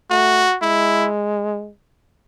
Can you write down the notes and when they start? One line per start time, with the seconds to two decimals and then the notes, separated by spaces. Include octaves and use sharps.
0.10 A3 F#4
0.62 G#3 E4